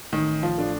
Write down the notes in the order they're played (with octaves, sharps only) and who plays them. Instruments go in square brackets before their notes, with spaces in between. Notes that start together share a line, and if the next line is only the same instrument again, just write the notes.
[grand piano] A1 [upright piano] D#3
[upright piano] F3
[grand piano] A2 A3 D4